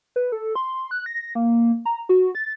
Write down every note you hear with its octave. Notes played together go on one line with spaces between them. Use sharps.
B4
A4
C6
F#6
A#6
A#3
A#5
F#4
A6